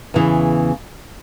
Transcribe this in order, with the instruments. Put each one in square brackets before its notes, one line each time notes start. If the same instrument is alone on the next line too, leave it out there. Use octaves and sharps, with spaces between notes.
[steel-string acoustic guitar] E2 C#3 E3